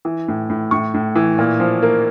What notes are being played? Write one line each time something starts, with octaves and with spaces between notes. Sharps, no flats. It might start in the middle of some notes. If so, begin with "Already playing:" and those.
E3
A2
A2
A2 C#6
A2
E3
A#2
F3
A#3